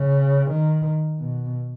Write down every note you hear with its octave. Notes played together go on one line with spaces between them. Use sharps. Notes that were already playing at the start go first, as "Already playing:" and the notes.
Already playing: C#3
D#3
B2